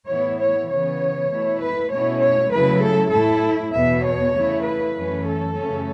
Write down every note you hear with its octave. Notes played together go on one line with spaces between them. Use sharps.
A2 E3 B3 E4 C#5
C#5
C#3 E3 B3 C#5
B2 A3 E4
B4
B2 A3 C#4 E4 C#5
C#5
C#3 F#3 A3 E4 B4
A4
A2 A3 E4 A4
E2 B2 B3 E5
C#5
C#3 A3 E4
B4
F#2 E3 A3 C#4
A4
F#2 C#3 E3 A3 C#4